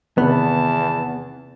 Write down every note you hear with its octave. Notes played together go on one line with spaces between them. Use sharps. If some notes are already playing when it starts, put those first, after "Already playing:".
E2 C3 D#3 B3 C4 A5